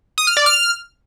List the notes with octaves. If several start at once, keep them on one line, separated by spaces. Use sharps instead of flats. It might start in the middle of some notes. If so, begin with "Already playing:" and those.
D#6
F6
D5
F6